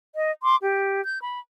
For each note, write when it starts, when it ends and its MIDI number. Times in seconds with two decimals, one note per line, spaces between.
0.14 0.33 75
0.43 0.56 84
0.43 0.56 86
0.61 1.02 67
1.05 1.20 91
1.22 1.39 83